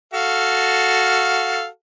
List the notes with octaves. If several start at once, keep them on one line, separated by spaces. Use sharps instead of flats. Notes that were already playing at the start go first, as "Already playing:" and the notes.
F#4 A4 F5